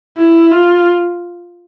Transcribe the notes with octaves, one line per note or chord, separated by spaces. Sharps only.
E4
F4